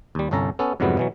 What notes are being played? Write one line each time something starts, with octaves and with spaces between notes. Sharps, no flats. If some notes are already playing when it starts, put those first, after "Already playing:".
D#2 G3
G1 C2 C#4 A4 A#5
B3 C#4 A4
F2 G#2 C3 F#3 G3 B3
B2 E3 F#3